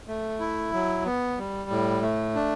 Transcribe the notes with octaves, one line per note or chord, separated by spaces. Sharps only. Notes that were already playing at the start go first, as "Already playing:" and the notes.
A3
E4
F#3
B3
G3
A2
A3
D4